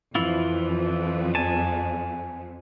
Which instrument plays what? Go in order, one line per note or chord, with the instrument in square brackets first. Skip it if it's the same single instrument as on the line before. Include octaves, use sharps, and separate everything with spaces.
[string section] F2 [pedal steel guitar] E3 E4 F4
[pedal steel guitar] G#5 A5